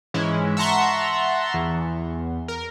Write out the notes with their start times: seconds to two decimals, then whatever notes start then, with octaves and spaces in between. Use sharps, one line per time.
0.14 G#2 E3 G#3 C#4 E4
0.57 E5 F#5 A5 A#5 C6 C#6
1.54 E2
2.48 A#4